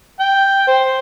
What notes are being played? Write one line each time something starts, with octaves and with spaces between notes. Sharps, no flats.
G5
C5